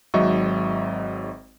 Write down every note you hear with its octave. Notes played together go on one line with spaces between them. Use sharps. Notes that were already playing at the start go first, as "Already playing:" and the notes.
G#1 G#2 F#3 D#5 E5 C#6